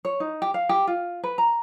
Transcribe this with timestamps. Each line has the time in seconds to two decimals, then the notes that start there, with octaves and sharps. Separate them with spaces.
0.05 C#5
0.20 D#4
0.42 G4
0.54 F5
0.69 G4
0.87 F4
1.24 B4
1.38 A#5